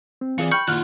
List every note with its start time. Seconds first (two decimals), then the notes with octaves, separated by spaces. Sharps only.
0.21 C4
0.38 E3 F4 G#4 D5 C#7
0.51 G5 B5 C#6 F6 G6 C#7
0.68 A#1 D#3 E4 F4 F#5 F6 F#6